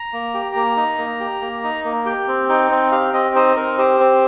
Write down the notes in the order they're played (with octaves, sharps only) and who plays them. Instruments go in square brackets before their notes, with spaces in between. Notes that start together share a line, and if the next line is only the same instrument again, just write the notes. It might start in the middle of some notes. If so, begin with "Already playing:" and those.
Already playing: [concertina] A#5
A#3
G4
A#3
D#4
A#3
G4
A#3
D#4
A#3
G4 G5
C4
D#4 G5
C4
G4 F5
C4 D#5
D#4 C5
C4 A#4
G4 C5
C4